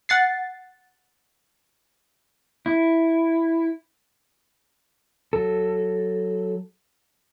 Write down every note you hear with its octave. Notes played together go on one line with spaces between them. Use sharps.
F#5 A6 C7
E4
F#3 A4